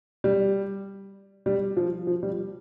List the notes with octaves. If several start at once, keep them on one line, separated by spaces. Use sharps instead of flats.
G3
G3
F3
F3
G3